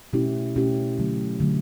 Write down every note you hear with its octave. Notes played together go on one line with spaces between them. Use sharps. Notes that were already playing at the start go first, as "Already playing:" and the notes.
B2 A3 C#4 E4 G4
B2 A3 C#4 E4 G4
D3 F#3 A3
D3 F#3 A3